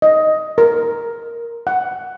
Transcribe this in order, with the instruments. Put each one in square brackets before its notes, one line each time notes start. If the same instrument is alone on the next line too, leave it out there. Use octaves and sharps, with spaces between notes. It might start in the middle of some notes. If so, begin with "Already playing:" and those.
[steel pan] D#5
A#4
F#5